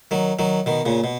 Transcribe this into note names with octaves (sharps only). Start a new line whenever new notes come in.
D#3 F#3
D#3 F#3
B2 D#3
A#2 C#3
B2